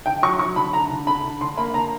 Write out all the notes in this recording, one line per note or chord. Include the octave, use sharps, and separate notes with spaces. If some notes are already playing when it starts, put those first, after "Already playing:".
D3 G5
F#3 C#6
F#3 C#6
D3 B5
D3 A#5
D3
D3 B5
D3
D3 C6
A#3 B5
D3 A#5